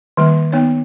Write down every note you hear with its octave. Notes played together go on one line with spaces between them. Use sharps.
D#3 G3 A#3
B3 D#4 C#5